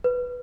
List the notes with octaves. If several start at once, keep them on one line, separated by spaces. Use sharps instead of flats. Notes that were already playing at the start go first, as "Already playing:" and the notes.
B4